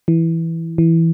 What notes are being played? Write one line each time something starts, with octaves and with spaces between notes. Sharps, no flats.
E3
E3